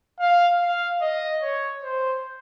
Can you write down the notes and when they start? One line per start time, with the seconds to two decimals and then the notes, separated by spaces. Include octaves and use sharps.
0.20 F5
0.60 F5
1.01 D#5
1.42 C#5
1.83 C5